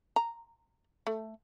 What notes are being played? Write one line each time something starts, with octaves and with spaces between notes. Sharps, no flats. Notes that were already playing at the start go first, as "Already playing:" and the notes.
A#5
A3